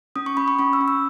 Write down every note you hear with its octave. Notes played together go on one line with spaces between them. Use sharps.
C#4 D#6
C#6
C#4 B5
C#6
C#4 C#6
E6
C#4
E6